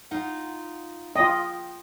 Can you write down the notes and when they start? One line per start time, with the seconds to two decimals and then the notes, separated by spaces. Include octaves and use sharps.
0.11 D#4 F4 F#5
1.16 F4 D#5 G5